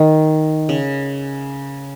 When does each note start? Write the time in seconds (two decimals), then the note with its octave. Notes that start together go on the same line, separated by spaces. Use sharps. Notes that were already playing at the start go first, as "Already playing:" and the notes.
Already playing: D#3
0.69 C#3